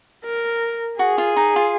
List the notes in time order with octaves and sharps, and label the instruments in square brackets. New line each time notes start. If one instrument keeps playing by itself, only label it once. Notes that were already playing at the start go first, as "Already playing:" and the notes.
[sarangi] A#4
[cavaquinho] F#4 [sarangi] G#4
[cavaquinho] F4
D#4
F4